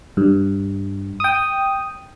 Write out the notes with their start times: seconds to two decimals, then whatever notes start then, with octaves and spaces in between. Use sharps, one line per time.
0.17 G2
1.20 G5 D#6